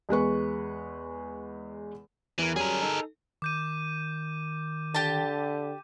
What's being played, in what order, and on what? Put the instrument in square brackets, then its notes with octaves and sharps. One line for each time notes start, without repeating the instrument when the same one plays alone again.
[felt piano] E2 G#3 B4 C#6
[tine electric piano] E2 A#4 [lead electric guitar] E3
[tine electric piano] F#3 G3 C#4 [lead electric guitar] G#4 A#4
[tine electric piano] D#4 A4
[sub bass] D#3 [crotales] D6 G6 D#7
[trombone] D3 [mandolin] G4 A5